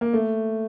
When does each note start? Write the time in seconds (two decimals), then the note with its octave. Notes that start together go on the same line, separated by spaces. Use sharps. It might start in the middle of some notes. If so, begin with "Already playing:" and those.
0.01 A#3
0.13 A3